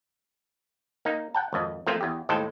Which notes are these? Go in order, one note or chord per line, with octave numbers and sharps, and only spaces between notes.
A#3 D#4
F#5 G5 A5
G#1 F2 D#5
F3 A3 A#3 C4 F4
E2 G4
D#2 A2 G#3 A4 C5 G5